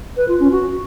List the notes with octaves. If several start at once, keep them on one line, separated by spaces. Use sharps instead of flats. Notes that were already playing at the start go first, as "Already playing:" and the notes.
B4
F4
C#4
F#4